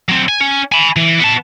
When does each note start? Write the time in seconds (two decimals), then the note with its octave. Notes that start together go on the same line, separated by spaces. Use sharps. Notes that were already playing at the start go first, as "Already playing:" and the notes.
0.09 F#3 C4
0.29 G#5
0.41 C#4
0.72 G#5 B5
0.96 E3
1.20 B3 A5